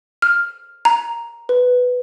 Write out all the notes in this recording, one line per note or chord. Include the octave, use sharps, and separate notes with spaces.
F6
A#5
B4